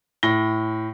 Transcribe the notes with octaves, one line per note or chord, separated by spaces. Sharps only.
A2 A#6 G7